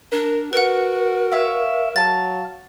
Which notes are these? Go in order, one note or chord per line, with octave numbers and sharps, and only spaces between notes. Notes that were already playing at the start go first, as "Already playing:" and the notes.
D4 A#4
F#4 A#4 B4 F#5
C#5 E5 F5
F#3 F5 A5 A6